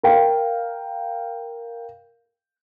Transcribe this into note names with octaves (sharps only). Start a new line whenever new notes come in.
A#4 F5 G5